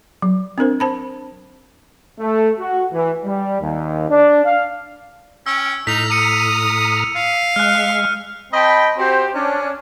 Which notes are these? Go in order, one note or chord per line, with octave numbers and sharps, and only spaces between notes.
F#3
C4 D4 A#4 C5
C5 A5 B5
A3
F#4
E3
G3
D#2
D4
F5
C#4 G5 E6
A2 D#4 A#5 F6 B6 F7
D#6 C#7 D#7
F5
G#3 F6 F#6
C4 D#5 G5 A5 B5
C4 F#4 G4 C5
C#4 D4